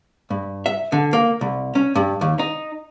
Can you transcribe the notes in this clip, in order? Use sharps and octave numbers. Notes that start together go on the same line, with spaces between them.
G2
E5
D3
A#3
C2
C#4
G2
D#2
D#4